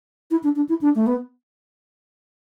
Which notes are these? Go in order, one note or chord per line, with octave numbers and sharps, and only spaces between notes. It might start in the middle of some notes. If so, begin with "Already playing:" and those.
E4
D4
D4
E4
D4
A3
B3